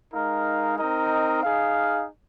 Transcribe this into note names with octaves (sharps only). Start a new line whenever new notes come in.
G#3 D#4 A#4 F5
C4 D#4 A#4 D#5
D#4 G#4 F5